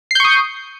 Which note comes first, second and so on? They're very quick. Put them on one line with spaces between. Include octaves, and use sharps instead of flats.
C7 G6 C#6 D#6